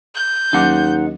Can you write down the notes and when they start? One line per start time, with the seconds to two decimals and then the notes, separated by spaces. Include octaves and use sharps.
0.15 G6
0.53 D#2 F#3 C#4 D#4 F#5 D6